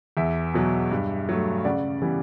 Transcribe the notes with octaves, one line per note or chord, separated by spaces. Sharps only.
E2 E5
B2 F#3
G2
F#3 A3
C#3 D5 F#5
E3 G3 B3